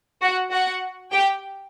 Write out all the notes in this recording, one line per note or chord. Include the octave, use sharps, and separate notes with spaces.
F#4 F#5
F#4 F#5
G4 G5